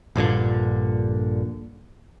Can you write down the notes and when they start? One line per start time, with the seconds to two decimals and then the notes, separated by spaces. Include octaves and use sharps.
0.16 A#1 G2 A#2 D3